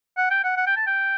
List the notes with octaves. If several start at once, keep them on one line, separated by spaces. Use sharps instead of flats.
F#5
G5
F#5
F#5
G5
A5
G5